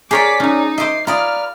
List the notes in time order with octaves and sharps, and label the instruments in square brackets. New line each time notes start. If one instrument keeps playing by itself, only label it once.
[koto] G4 A#4 [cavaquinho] G#4 C#5 D5 [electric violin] D6 B6
[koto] F#3 C#4 [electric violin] D#4
[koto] C5 E5 [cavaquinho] D#5 D6 [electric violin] C7
[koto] F4 G#4 [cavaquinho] B4 D5 A#5 [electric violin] F6